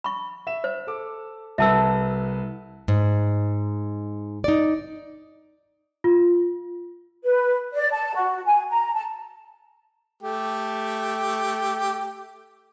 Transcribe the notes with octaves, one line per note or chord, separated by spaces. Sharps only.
B5 C#6
E5 E7
C5
A4 D6
C2 A4 B4 E5 A5 E6
G#2
D#4 D5
F4
B4
D5
A5
F#4
G#5
A#5
A5
A3 G4